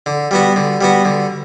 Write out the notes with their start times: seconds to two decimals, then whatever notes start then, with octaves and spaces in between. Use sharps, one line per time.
0.06 D3
0.31 G3 B3 F#4
0.56 D3
0.81 G3 B3 F#4
1.05 D3